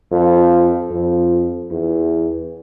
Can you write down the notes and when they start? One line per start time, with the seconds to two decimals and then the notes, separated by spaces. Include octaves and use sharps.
0.11 F2
0.91 F2
1.71 E2